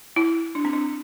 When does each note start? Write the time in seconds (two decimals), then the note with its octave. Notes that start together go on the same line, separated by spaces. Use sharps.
0.16 E4
0.55 D4
0.65 C4
0.73 D4